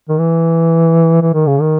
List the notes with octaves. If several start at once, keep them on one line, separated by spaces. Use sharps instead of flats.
D#3
E3
E3
D#3
C#3
D#3